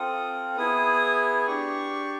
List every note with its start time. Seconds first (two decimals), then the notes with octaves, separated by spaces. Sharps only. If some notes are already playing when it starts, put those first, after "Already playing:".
Already playing: C4 F4 A4 D#6
0.56 B3 E4 G#4 D#6
1.47 D4 G4 C#6